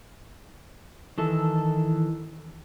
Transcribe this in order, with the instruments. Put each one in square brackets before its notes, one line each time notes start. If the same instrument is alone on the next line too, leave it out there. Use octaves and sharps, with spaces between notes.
[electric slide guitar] D#3 E3 A4